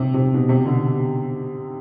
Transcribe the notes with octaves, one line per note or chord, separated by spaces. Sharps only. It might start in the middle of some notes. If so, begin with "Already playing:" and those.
Already playing: C3
C3
B2
C3
B2 D3